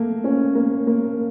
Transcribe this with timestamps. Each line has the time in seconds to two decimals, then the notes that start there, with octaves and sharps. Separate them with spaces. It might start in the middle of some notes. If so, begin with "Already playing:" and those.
Already playing: A3 A#3
0.24 C#4
0.55 A#3
0.87 A#3